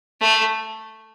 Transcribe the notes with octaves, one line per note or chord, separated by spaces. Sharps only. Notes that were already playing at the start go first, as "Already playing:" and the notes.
A3